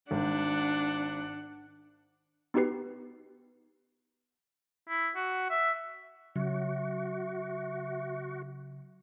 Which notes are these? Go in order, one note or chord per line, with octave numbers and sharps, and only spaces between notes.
G#1 D4 F#5
B3 D#4 F#4 G4 B4 C7
E4
F#4
E5
C#3 F#3 F#4 E5